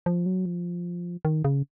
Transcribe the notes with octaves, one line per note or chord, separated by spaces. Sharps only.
F3
F#3
F3
D#3
C#3